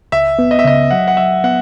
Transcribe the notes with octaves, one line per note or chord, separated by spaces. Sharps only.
C#2 E5
B3
D#5
E5
C#3 D#5
F#3 F#5
F#5
F#3 E5
B3 F#5